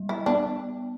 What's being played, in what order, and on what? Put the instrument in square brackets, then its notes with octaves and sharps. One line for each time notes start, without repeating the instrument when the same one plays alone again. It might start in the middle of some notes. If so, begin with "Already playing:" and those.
Already playing: [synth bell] G3
[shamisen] E4
[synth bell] B3 [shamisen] D4